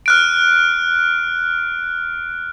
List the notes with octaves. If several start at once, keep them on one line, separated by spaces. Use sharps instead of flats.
F6 F#6 D7